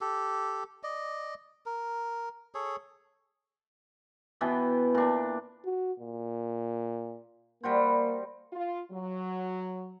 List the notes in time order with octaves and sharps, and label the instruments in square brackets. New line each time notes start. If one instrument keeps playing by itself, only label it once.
[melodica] G4 A4
D5 D#5
A#4
G#4 A4 C#5
[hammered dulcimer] B2 E3 B3 G5
A#2 D4
[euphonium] F#4
A#2
[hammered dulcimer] G3 F#4 C5 [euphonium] A#3
[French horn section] F4
F#3